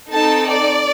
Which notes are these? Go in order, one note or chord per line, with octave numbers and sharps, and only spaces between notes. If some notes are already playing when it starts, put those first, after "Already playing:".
C4 D#4 A4 A5
D5